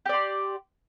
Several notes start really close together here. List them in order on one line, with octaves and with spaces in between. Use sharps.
G4 D5 C6